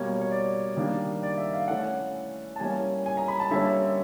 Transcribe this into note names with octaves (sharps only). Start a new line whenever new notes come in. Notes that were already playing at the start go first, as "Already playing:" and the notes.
Already playing: B2 G3 A#3 C#5
C#5
D5
D#3 G3 A#3 D4
D5
E5
F5
E3 A3 C#4 F#5
A5
E3 G3 A#3 C#4 G#5
G#5
A#5
B5
A5
D3 G3 A#3 C#4 E5